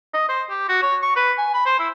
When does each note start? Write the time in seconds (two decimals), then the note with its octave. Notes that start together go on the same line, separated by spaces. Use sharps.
0.14 D#5
0.29 C5
0.50 G4
0.69 F#4
0.82 C#5
1.02 C#6
1.16 B4
1.38 G#5
1.54 B5
1.66 C5
1.79 E4